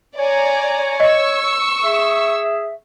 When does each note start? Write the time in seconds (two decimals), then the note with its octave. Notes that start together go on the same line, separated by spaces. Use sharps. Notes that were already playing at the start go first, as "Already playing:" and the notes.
0.17 C#5 D5 G#5 A#5
1.00 D#5 C#6 E6
1.84 G#4 E5